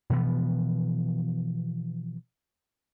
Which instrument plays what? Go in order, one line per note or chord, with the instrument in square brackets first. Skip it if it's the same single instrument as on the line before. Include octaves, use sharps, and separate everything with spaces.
[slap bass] B2 E3 F3 B3